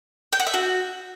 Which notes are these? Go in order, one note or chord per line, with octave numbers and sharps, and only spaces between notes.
G5
F#5
E5
F#4